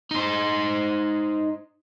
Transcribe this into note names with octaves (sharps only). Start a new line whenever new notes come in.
D#4 C5